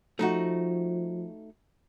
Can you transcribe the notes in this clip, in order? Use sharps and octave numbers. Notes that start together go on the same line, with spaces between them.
F3 A3 D#4 F#4